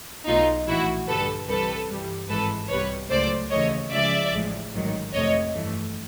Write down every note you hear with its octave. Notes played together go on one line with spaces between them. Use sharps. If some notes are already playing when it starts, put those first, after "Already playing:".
B1 B2 F#3 A3 D#4 F4
A#1 A2 E3 E4 F#4
G2 D3 G3 A4 B4
C2 C3 E3 G3 A4 B4
G2 E3 G3
G#1 G#2 E3 G#3 A4 B4
C2 B2 G3 B4 C#5
C#2 C#3 F#3 A3 C5 D5
D#2 C#3 E3 A3 C#5 D#5
C#2 C#3 F3 G#3 D5 E5
A1 A2 F3 G#3
A1 G#2 D#3 F#3
F2 C3 F3 A3 C#5 D#5
G2 E3 A3